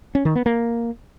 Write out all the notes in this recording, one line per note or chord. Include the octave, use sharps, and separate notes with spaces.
C#4
D#3
B3
A#3